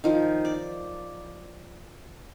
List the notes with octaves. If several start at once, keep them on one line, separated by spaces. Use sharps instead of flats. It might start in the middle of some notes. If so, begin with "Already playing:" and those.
D#3 F3
D5